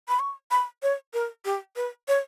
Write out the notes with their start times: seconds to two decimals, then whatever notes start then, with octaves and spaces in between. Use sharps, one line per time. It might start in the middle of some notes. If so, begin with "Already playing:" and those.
0.09 B5
0.19 C#6
0.51 B5
0.83 C#5
1.14 A#4
1.45 G4
1.76 B4
2.08 C#5